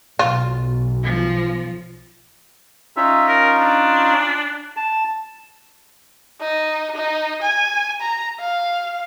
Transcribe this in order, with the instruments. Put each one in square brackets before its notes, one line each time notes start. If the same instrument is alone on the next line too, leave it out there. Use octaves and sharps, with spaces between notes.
[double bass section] B1 [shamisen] F4
[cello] F3
[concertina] C#4 D#4 F4 [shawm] E5
[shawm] A#4
D4
[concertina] A5
[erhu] D#4
D#4
G#5
A#5
F5